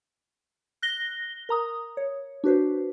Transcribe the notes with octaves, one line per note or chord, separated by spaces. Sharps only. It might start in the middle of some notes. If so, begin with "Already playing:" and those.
F#6 A#6 G7
A#4 A#5 D#6
C#5
D4 F#4 B4 C5